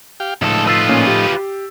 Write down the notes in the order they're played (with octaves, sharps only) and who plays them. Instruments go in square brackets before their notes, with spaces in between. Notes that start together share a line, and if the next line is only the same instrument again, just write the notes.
[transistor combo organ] G4 F5 G5
[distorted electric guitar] C#2 A4 [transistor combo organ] A2 F3 D#4
[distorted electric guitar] F4 B4 [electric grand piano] E6 A6 C7
[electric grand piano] A#2 C#4
G4